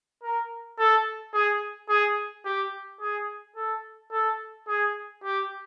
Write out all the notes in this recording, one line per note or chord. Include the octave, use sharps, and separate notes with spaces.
A#4
A4
G#4
G#4
G4
G#4
A4
A4
G#4
G4